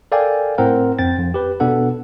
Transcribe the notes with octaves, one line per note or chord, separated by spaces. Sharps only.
A4 A#4 D5 F5 G5 G#5
A2 C4 A#4 F#5
F2 C4 G5 A6
F2
G4 B4
B2 B3 D4 A4 F#5